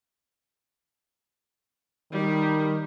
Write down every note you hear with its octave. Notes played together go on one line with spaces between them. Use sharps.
D#3 G3